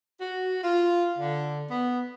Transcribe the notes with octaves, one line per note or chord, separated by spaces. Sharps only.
F#4
F4
D3
B3